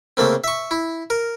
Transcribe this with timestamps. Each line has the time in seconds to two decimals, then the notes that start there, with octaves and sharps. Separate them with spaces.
0.17 C#3 A3 A#3 C4
0.44 E5 C#6
0.71 E4
1.10 A#4